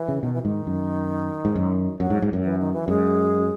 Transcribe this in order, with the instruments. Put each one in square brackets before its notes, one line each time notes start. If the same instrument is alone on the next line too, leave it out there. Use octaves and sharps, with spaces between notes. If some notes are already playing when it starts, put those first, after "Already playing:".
Already playing: [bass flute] E3
[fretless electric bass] C#3
[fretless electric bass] B2 [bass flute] D#3
[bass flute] E3
[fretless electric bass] G#2 [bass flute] D#3
[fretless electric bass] F#2
G#2
F#2
[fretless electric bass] F#2 [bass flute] F#3
[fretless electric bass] G#2
G#2
F#2
[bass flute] E3
D#3
E3
[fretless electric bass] F#2 [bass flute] G#3